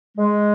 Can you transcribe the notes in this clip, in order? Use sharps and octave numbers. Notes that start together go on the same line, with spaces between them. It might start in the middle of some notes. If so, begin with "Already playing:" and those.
G#3